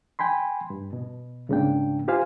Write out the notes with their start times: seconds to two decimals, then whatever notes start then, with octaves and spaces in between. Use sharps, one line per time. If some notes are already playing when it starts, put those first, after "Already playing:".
0.19 G5 G#5 B5 C6
0.70 G2
0.93 B2
1.49 C2 G#2 C#3 A#3 D4 G5
2.08 F4 G4 C5 F5 G#5